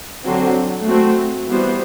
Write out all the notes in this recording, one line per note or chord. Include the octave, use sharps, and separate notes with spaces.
D3 F#3 C4
A3 C4 F#4
E3 G3 B3 F#4 C5